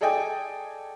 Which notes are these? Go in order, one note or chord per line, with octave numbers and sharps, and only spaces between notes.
G#4 A4 D5 D#5 G5 G#5